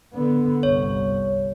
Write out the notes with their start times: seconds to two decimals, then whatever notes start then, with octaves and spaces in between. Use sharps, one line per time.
0.14 D3 B3
0.63 G1 C2 C#5